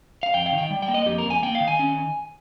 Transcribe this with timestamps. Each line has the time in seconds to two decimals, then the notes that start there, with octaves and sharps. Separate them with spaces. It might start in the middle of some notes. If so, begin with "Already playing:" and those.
0.23 F5
0.34 F2 G5
0.46 F5
0.52 D#3
0.58 G5
0.70 G3
0.82 G5
0.88 A#3
0.94 D#5
1.06 F2 G4
1.18 A#4
1.25 F2
1.30 G#5
1.43 A#3 G5
1.55 F5
1.60 D#3
1.68 G#5
1.79 C#4